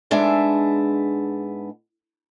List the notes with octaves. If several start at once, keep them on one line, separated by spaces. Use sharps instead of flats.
G#2 G#3 B3 D4 E5